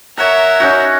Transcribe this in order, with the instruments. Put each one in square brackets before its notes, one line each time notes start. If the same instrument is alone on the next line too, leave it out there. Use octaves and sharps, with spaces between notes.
[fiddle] A#4 E5 [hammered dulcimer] C#5 F#5 A#5
[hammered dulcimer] C#4 D#4 F#4